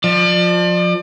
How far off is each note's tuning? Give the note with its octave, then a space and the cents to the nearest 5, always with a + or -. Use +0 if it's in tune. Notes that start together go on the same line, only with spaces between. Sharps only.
F3 +25 D5 +40